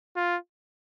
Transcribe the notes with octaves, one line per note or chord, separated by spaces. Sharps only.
F4